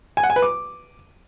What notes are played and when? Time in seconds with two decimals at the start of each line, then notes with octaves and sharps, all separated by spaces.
0.17 G#5
0.23 F#5
0.30 G#5
0.36 B4
0.42 D6